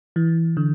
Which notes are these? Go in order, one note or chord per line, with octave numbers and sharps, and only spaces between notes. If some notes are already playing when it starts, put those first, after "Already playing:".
E3
D3